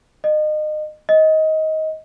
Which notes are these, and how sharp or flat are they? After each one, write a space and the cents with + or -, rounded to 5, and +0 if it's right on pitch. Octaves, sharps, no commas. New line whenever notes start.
D#5 -30
D#5 +20